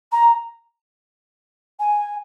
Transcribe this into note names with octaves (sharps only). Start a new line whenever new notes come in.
A#5
G#5